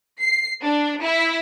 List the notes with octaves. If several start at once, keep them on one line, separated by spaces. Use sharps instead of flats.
C7
D4
E4